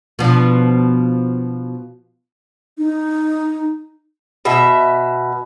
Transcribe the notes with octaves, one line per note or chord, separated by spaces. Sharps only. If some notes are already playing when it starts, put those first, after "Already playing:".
B2 F3 D4
D#4
B2 E5